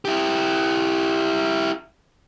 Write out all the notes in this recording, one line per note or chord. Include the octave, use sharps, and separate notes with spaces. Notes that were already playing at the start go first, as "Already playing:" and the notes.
E4 G4